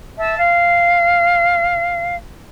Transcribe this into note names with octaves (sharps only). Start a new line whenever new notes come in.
E5 A5
F5